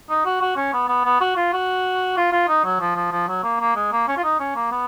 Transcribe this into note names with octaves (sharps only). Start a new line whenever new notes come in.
D#4
F#4
F#4
C#4
B3
B3
B3
F#4
F4
F#4
F4
F4
D#4
F#3
F3
F3
F3
F#3
A#3
A#3
G#3
A#3
C#4
F4
D#4
C#4
A#3
B3